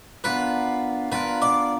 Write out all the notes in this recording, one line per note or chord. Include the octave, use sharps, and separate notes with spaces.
B3 D4 F4 A#4 B4
B3 D4 F4 A#4 B4
D5